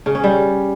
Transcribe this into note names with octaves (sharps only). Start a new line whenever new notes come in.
C#3
C#4
G3